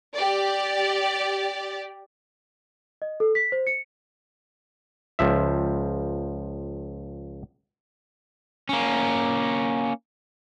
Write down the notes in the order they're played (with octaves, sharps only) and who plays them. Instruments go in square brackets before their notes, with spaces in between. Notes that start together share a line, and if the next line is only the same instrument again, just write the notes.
[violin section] G4 D5
[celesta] D#5
A4
B6
C5
C#7
[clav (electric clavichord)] C#2 F3 E5
[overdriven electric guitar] A#3 C#4